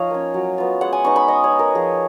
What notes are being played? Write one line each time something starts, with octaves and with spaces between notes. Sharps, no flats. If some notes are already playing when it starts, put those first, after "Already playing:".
Already playing: F3 D#4 F4 C#5 D#5 F5
A#3 C#4
F#3
B3 F4
G#3 F#5
G#5
B3 D#4 C#6
B5
G#3 D#5
C#5
D#4
A#4
F3 G#4